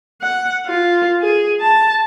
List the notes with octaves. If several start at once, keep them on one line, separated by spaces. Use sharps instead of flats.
F#5
F4
G#4
A5